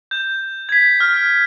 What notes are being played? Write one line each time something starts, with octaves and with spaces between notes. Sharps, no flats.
G6
G#6 B6
F6